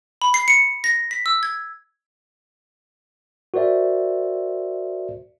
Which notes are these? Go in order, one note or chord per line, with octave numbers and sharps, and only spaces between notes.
B5
C7
C#7
A#6
B6
E6
G#6
F#4 A#4 C5 D5 E5